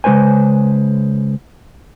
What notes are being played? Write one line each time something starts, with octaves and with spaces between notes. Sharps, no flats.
C#3 G#3 D4 B4 C5 G#5